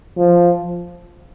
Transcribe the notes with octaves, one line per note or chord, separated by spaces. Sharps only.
F3